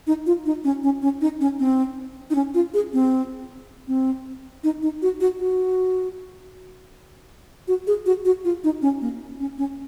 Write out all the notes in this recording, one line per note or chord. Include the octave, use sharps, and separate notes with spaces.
D#4
F4
D#4
C#4
C#4
C#4
D#4
C#4
C4
D#4
C#4
F4
G#4
C4
C4
D#4
D#4
F#4
F#4
F#4
F#4
G#4
F#4
F#4
F4
D#4
C#4
A#3
C#4
C#4